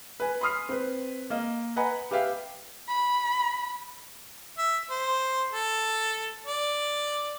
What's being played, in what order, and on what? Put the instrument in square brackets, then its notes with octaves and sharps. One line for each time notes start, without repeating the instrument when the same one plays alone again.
[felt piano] B4 G#5
B5 C6 D#6 F6 C7
C4 B4
A#3 D#5
B4 D#5 F#5 G#5 A#5 B5
G4 B4 E5 F5 G5
[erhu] B5
[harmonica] E5
C5
A4
D5